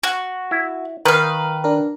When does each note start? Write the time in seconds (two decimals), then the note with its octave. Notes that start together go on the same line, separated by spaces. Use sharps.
0.03 F#4
0.51 E4
1.05 D#3 A#4 B4 F5
1.64 D4 A#4